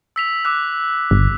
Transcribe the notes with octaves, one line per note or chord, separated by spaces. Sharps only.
E6 B6 F7
D6 E6 F#6
G1